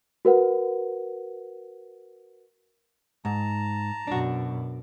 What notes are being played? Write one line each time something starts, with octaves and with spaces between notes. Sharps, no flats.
F#4 A#4 B4 F#5
G#2 A5 A#5
F#2 B2 D4 F#4